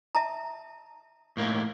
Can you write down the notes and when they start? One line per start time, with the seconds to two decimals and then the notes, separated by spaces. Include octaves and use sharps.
0.15 E5 A5 A#5
1.37 A2 A#3 D#4